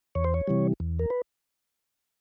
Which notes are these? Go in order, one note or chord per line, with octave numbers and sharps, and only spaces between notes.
E2 C#5
C5
C#5
C3 E3 G3
E2
A#4
B4